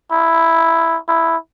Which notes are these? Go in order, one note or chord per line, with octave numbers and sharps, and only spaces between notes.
E4
E4